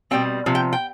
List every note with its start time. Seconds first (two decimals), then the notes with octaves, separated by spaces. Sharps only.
0.11 B2 G3 C4 G5
0.46 C3 F3
0.55 G5
0.73 G5